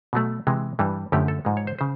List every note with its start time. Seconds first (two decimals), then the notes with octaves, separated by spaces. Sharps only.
0.13 B2 F#3 A3
0.47 C3 E3 G#3
0.79 G2 E3 G3
1.12 F#2 D3 F3 A3 G4
1.28 A4
1.45 G#2 F3 G#3
1.57 C#5
1.67 C5
1.79 C#3 C5